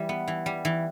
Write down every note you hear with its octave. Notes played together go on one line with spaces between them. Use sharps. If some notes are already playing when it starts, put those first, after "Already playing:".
Already playing: E3 G3
B3
E3
G3
E3